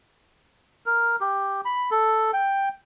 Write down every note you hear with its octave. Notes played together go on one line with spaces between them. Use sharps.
A#4
G4
B5
A4
G5